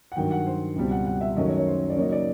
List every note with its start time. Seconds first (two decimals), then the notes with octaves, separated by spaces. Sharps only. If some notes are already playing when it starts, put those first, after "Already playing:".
0.12 F#5
0.16 G2 D#3 F#3 G5
0.31 F#5
0.46 C5
0.76 C#2 B2 G3 C4
0.91 F#5
1.07 F#5
1.21 E5
1.37 F#2 D#3 F#3 A3 C#4 D#5
1.47 C#5
1.57 C#5
1.67 C5
1.90 D5
1.96 C#3 F#3 A#3 D#4 C#5
2.12 D5